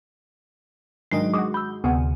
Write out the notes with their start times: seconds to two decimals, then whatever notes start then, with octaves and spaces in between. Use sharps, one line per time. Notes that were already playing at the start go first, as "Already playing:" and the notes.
1.12 G#2 D#3 F#3 G#3 D4 D#5 C7
1.34 G#3 F#4 D6 D#6
1.54 B5 E6 G6
1.84 D2 C3 B3 G#4 F#5